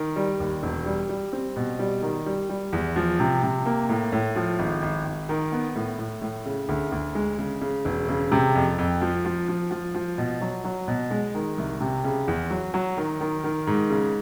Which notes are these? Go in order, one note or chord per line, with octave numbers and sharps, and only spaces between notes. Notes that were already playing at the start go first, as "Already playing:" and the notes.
Already playing: D#3
G3
D#2
E1
G3
G3
C4
B2
G3
D#3
G3
G3
E2
F3
C3
C3
A#3
A2
A2
F3
G#1
G#1
G#1
D#3
B3
A2
A2
A2
C#3
D2
D2
G#3
C#3
C#3
E1
C#3
C3
F2
F2
F3
F3
F3
F3
F3
B2
F#3
F#3
B2
G#3
D#3
C2
C3
C#3
E2
F#3
F#3
D#3
D#3
D#3
G#2
C#3